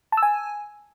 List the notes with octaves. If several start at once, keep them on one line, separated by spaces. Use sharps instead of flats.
A5
E6
G#5